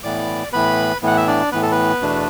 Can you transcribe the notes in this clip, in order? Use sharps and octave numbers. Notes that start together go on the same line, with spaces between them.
A2 E3 B3 D5 D6
A2 E3 B3 B4 B5
A2 E3 B3 F#5
E5
D4 D5
A2 E3 B3 B4
A4
B3 B4
E2 B2 A3 D4